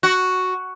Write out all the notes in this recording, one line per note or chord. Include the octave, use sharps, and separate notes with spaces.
F#4